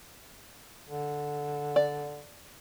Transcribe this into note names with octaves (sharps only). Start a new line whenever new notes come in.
D3
D5